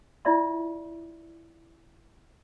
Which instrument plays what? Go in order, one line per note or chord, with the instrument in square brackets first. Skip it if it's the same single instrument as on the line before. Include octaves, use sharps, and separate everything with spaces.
[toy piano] E4 F4 D5 E5 C6